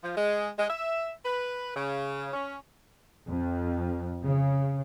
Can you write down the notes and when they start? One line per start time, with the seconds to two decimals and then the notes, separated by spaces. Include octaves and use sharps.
0.04 F3
0.17 G#3
0.58 G#3
0.70 E5
1.25 B4
1.76 C#3
2.33 C#4
3.29 F2
4.24 C#3